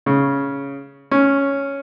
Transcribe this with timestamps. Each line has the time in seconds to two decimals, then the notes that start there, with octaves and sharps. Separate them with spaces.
0.06 C#3
1.11 C#4